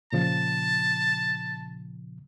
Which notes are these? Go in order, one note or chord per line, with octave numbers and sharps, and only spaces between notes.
A#2 C#3 F3 A5